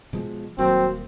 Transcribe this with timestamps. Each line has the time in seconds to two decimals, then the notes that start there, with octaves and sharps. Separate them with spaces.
0.13 B2 F3 G#3
0.58 D#1 F#3 A#3 C4